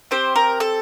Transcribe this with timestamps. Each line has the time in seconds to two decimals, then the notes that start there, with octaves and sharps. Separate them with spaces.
0.11 C4 G4 C5
0.36 A#4
0.60 A4